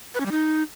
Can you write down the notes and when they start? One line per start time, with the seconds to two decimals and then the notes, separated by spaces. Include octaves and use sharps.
0.15 B4
0.20 C#4
0.26 G3
0.31 D#4